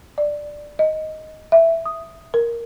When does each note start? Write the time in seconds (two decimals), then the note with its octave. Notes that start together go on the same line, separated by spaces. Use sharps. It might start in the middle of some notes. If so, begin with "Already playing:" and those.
0.18 D5
0.79 D#5
1.52 E5
1.86 D#6
2.34 A#4